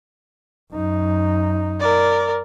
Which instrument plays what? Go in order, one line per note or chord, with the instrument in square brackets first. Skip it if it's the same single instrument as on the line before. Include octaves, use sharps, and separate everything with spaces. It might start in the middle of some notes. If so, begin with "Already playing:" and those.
[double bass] F#2 D#4
[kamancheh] A#4 D5